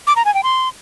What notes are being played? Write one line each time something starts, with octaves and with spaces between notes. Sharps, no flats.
D6
A#5
G#5
G5
C6